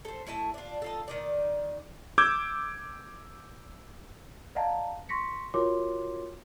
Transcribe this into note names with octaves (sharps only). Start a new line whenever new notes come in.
A4 C5
A3 E4 D#5 A5
D4 F4
D#4 F4 A4
D#3 D#4 D5
D6 E6 G6 G#6
D5 D#5 F5 F#5 A5 A#5
C6 C#6 A#6 B6 C#7
F4 F#4 A#4 C#5 C6 D6